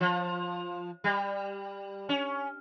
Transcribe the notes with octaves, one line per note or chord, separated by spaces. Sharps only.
F3
G3
C#4